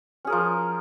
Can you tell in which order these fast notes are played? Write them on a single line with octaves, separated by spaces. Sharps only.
C#4 G#4 A#4 F3